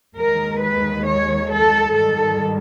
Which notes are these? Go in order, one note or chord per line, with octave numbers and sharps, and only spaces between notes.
D#2 D#3 G#3 A#4
B4
C#5
A4
G#2 D#3 G3 A4